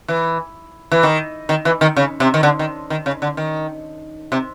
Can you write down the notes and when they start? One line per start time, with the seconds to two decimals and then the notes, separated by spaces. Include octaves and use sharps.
0.08 E3
0.91 E3
1.03 D#3
1.49 D#3
1.65 E3
1.81 D#3
1.96 C#3
2.20 C3
2.34 D#3
2.43 D3
2.59 D#3
2.90 D#3
3.06 C#3
3.22 D3
3.37 D#3
4.32 C3